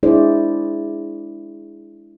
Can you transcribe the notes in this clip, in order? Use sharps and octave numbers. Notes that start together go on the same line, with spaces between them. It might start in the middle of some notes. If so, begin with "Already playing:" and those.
G#3 D4 E4 G#4 C5 D5